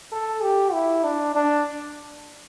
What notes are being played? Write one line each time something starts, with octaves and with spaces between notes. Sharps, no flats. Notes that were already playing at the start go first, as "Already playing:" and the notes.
A4
G4
E4
D4
D4